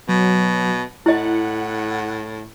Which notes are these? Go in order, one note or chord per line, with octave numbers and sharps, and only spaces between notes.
B2 F#3
A2 E4 D#5 F#5